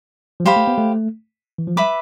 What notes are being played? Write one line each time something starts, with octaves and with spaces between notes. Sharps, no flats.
F3
G3 G4 C5 F5 B5
A3
B3
A3
E3
F3
G3 B4 E5 B5 D6